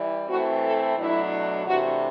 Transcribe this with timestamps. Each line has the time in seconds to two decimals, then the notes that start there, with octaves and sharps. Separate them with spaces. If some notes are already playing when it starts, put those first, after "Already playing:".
Already playing: E3 G3
0.28 E3 A3 C4 F#4
0.62 A4
0.97 B2 F#3 A3 D4 E4
1.66 C3 E3 A3 D4 F#4